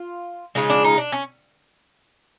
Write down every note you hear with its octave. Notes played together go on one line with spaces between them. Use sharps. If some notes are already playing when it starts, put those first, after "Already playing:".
Already playing: F4
C#3 F3 G#3 D#4
D4
D#4
D4
C#4